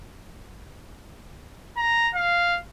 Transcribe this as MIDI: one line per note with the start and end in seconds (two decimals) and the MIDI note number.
1.77 2.09 82
2.15 2.58 77